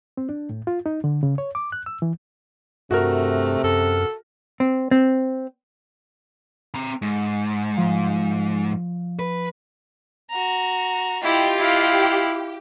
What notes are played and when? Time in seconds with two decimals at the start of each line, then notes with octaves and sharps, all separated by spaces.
0.17 C4
0.29 D4
0.50 A2
0.67 F4
0.86 D#4
1.04 D3
1.23 C#3
1.38 C#5
1.55 D6
1.72 F#6
1.86 E6
2.02 E3
2.91 G2 C3 A3 F#4 A#4
3.64 F#2 A4
4.60 C4
4.91 C4
6.74 C4 A#5
7.02 G#2
7.77 F3
9.19 B4
10.30 F#4 A#5
11.23 E4 F4 G4 D#5
11.57 E4 F5